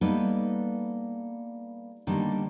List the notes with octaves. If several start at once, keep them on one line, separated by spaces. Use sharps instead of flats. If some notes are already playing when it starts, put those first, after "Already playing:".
G3 A#3 B3 D#4 A4 B4
D3 D#3 G3 A#3 B3 D4